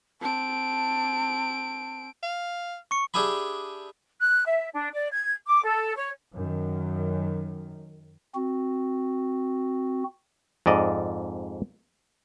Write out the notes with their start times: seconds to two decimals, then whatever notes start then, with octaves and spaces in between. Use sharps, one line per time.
0.22 C4 A5 D7
2.23 F5
2.91 C#6 C#7
3.14 D4 G4 G#4 E5 G#5 B5
4.20 F#6
4.45 E5
4.73 D4
4.94 D5
5.12 G#6
5.47 D6
5.64 A4
5.96 C#5
6.34 F#2 D#3
8.35 C4 F#4
10.66 F2 G#2 D5 D#5